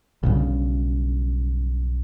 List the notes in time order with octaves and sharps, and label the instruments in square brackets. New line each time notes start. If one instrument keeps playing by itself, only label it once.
[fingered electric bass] B1 G2 C#3